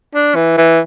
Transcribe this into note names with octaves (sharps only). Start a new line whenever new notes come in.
D4
E3
E3